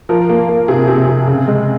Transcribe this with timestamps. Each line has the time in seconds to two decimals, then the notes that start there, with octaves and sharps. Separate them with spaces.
0.09 F3 A#4
0.29 A#3
0.49 A#3
0.68 C3 G#4
0.88 C3
1.08 C3
1.27 C#3
1.48 G#3